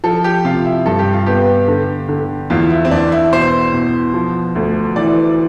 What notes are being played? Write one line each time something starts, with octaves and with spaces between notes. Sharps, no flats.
F3 A4
G4
C3 F4
E4
G2 A4
G4
F4
B3 G4
D3
D3
E2 F4
E4
C4
E2 D4
E4
B2 C5
B2
F3
D2
E3 D5